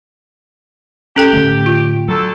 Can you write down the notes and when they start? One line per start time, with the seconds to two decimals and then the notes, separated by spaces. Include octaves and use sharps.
1.16 C#4 G4 A4 G5
1.33 A2 D3 A3
1.66 F4
2.09 D2 F#3 A4